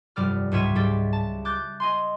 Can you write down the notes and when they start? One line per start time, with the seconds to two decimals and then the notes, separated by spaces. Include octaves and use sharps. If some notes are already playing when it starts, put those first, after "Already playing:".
0.16 F1 G2 G3 D5 F6
0.52 C#2 G#2 G3 C#5 E5 D#7
0.75 G#2 G3 G4 A6
1.13 A5
1.45 D6 F#6 G6 A6
1.80 D#5 G#5 C6